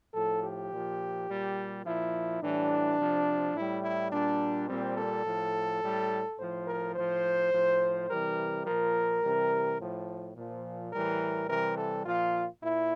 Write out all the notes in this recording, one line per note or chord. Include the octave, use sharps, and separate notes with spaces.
A2 F3 A4
G4
A#2 F3
A#2 G3
A#2 F3 E4
A2 E3 G3 D4
C3 F3
A2 G3 E4
E4
A#2 G3 D4
A#2 G3 C4
A4
A2 F3
A2 G3
A2 F3 C5
A#4
A2 F3 C5
A2 F3
C3 E3 G3 A#4
A#2 F3 A#4
C3 E3 G3
A2 F3
A#2 F3
A2 E3 G3 A#4
C3 E3 G3 A#4
A4
A#2 F3 F4
A#2 E4